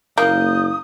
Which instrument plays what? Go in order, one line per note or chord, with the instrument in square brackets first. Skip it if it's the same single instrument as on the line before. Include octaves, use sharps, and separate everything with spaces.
[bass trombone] F#1 [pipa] A#3 [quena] D#6 [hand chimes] G6